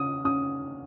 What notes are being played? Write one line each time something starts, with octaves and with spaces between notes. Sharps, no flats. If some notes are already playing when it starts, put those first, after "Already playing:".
Already playing: C#4 D#6
C#4 D#6